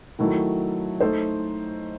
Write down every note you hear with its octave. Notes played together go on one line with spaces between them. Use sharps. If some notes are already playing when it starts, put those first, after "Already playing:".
D#3 F#3 A3 E4
A3 D#4 A4 C5